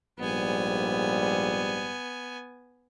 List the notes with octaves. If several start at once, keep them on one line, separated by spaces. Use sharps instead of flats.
A#1 G#2 G3 B3 G#5